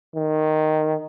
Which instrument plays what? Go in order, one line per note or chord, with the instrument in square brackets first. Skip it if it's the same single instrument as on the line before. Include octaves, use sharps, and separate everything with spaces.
[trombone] D#3